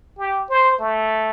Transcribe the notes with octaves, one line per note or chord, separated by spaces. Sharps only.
G4
C5
A3